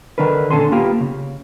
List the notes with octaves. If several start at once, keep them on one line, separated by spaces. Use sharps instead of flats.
D3 D#3 D4 A#4 B4
A#2 D3 C#4 A4 G#5 C6
A#3 B3 F4 G4
C#3